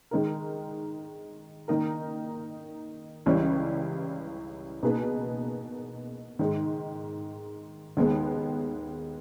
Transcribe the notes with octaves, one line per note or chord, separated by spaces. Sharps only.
D#3 G#3 D#4 A#4
D#3 A#3 D#4 A#4
C#2 C#3 E3 G3 C#4
B2 A#3 D#4 G#4 B4
G#2 D#3 G#3
D#2 D#3 G#3 B3